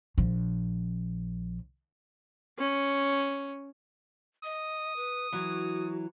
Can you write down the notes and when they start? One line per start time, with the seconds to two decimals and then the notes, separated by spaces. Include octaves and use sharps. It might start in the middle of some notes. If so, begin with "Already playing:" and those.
0.18 A#1 F3
2.58 C#4
4.44 D#5 D#6
4.96 B4
5.32 E3 F#3 F#4